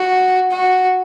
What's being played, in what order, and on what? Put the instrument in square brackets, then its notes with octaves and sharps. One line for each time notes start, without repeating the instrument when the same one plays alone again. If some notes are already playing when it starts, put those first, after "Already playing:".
Already playing: [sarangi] F#4
F#4